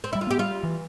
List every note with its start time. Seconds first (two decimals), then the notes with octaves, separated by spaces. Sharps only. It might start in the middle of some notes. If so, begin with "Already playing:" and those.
0.04 C4
0.13 G3 E4
0.21 F4
0.27 B3 G4
0.39 G3 F4
0.63 E3